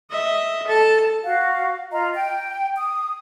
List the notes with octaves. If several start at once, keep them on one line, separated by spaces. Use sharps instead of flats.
D#5 E5
A4 A5
F#4 F5
F4 D#5 A#5
G5
D#6